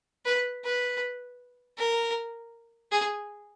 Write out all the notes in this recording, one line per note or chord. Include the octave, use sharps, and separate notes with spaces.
B4
B4
A#4
G#4